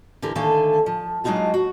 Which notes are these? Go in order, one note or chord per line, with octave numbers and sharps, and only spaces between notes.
D3 E3 G4 A#4
D3 D#3 A3 A4 F5 G#5
F3
F#3 G#3 D4 D#4 F4 F#4
F#4